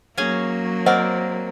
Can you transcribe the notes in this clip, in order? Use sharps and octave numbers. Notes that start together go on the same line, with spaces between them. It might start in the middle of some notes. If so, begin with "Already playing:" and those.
F#3 A#3 C#4 G#4 G#5
C4 A#4 C5 D5 D#5 F#5